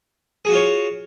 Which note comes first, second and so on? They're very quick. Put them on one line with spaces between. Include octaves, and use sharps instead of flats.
G#4 F#4 F4 C#5